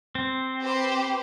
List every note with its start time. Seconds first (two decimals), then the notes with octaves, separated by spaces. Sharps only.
0.15 C4
0.60 G4 B4 C5